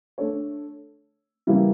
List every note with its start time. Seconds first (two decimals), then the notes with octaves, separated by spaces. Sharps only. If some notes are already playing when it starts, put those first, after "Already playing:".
0.18 A3 D4 A4 C#5
1.47 C#3 E3 G3 A#3 E4